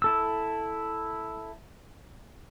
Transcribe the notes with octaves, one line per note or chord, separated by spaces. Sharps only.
E4 A4 E6